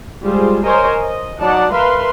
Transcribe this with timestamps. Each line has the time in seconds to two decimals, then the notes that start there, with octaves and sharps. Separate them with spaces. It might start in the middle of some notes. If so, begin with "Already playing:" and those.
0.23 G3 G#3 F4 G#4 C5
0.65 A#4 C5 C#5 D#5 G#5
1.00 D#5
1.39 F#3 D#4 D5 F#5 A5
1.72 A#4 B4 E5 F5 C6